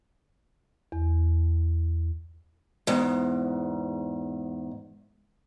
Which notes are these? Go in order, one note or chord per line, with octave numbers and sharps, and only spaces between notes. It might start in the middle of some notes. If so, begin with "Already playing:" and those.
E2
E2 G#2